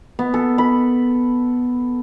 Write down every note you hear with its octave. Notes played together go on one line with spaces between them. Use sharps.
B3
A4
B5